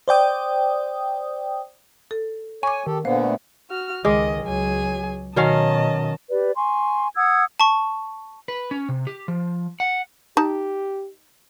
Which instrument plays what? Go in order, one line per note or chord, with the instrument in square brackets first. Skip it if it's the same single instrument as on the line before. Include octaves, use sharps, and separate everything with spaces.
[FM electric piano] C5 D5 G5 D#6
[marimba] A4
[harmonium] C#5 [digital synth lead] G#5 [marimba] C#6 D6
[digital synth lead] D#3 [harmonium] G4 A4
[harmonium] A#2 D3 B3 [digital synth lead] A#3 [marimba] C5
[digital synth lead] A3
[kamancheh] F#4 F6
[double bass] C#2 D#3 [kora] G#3 [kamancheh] D#5 [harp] D6 F6
[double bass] C#2 F#3 [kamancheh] G#4 G#5
[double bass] B2 [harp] D#3 [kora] F#3 C#4 F5 [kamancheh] D#5 A5
[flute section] G4 B4 D5
G#5 C6 C#6
F#5 D#6 E6 G#6
[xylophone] A5 C#6
[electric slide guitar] B4
C#4
C3
G4
F3
F#5
[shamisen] D#4 A5 [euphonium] G4